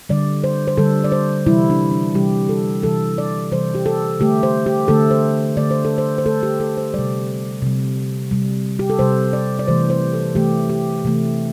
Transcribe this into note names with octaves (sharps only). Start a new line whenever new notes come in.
D3 G3 D5
C5
C5
D3 G3 A4
D5
C5
C3 E3 G3 E4
D4
D4
C3 E3 G3 G4
A4
C3 E3 G3 A4
D5
C3 E3 G3 C5
G4
A4
D3 A3 G4
C5
G4
D3 A3 A4
C5
D3 A3 D5
C5
A4
C5
C5
D3 A3 A4
G4
A4
C5
C3 G3 D5
C3 G3
C3 G3
G4
A4
C3 G3 C5
D5
D5
C3 E3 A3 C5
C5
A4
C3 E3 A3 G4
G4
C3 E3 A3